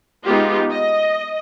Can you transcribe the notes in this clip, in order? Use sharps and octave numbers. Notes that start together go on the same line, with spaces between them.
G#3 B3 D#4 F4 G4
D#5